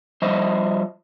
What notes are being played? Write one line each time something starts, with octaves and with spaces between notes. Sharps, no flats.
F3 G3 C5 D#5 E5